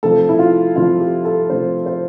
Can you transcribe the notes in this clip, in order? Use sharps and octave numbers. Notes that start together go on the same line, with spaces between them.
C3 F3 A3 A4
E4
F4
C3 F3 A3 F4
G4
A4
C3 F3 A3 C5
C5